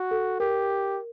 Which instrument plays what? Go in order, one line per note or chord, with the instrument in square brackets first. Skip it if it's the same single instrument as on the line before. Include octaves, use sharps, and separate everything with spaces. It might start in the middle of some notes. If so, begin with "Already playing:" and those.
Already playing: [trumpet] F#4
[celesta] A4
[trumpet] G4 [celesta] A#4